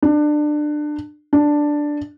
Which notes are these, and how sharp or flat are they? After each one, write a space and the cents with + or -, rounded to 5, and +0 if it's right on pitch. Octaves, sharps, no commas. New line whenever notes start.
D4 +25
D4 +5